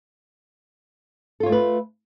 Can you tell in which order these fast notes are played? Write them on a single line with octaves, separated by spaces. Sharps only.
A4 F4 C#5 A3 B4